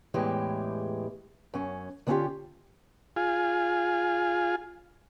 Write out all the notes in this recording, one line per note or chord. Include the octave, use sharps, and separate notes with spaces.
E2 A2 E3 G#3 G4 G#4
F#2 C#4
D3 B3 C#4 D#4 F4 G4
F4 G#4